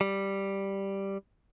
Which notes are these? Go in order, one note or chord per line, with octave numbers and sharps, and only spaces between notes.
G3